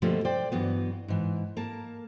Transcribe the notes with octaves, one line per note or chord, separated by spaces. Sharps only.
B2 D3 F3 G3 A3 A#3
C5 D5 G5
G2 E3 F#3 B3
G#2 E3
A#3 A#4 A5